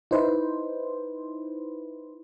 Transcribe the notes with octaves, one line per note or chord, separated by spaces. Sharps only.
D#4 E4 B4 C5